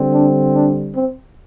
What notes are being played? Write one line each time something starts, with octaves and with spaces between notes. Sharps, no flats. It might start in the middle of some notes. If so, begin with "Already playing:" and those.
Already playing: D3 G3 C4
D4
D4
C4